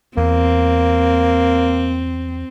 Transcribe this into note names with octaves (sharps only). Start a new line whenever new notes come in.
E2 A#3 C4